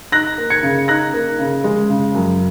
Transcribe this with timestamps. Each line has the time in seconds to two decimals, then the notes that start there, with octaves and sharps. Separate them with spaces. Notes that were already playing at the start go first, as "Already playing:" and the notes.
0.12 D#4 F#6 A#6
0.38 A#3
0.50 G#6 C#7
0.63 C#3
0.88 D#4 F#6 A#6
1.14 A#3
1.39 C#3
1.64 G#3
1.90 C#3
2.14 F#2